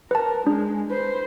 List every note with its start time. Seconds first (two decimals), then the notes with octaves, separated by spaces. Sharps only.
0.11 A#4 B4 A5
0.47 G#3 D4
0.90 B4 C5